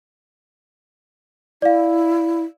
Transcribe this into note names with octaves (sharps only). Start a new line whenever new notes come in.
E4 D5 F5